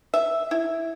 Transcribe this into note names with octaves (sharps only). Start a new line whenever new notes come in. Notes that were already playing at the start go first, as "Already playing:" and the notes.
E5
E4